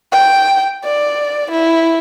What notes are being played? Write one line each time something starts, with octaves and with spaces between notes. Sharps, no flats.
G5
D5
E4